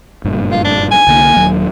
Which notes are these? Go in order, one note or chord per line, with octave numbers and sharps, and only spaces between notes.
F#1 G2 A#2
F4
D4
G#5
C2 D3 A#3
D#1 D#2 F#3